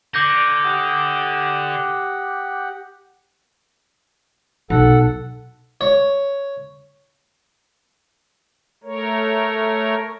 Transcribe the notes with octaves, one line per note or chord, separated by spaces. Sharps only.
D3 D6 G6 A#6
G4 F#5 D#6
B1 A4 F#5
C#5
A3 A#4 C#5